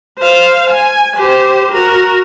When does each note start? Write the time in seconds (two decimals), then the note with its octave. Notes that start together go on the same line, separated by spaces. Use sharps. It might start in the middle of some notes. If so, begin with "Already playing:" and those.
0.18 C5 F5
0.71 G#5
1.17 G4 C5
1.71 F#4 A#4